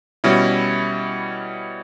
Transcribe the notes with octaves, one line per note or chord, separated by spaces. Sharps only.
B2 G3 C#4 E4